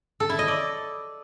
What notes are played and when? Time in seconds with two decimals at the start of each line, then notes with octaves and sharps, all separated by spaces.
0.20 A4
0.29 E4
0.39 D#5
0.48 D5